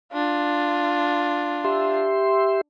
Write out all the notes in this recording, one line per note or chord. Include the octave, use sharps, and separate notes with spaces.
D4 F4
G4 E5 C6